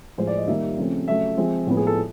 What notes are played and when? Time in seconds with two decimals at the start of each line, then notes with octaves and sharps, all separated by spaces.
0.18 A2 F3 G#3 C5
0.27 D5
0.37 D#5
0.47 D#3 G3 A#3 E5
0.78 C#3 F3 A3 C4
1.08 C#3 F#3 A3 E5
1.37 F3 G#3 C4
1.67 A2 F3 G#3 B3
1.77 G#4
1.87 A4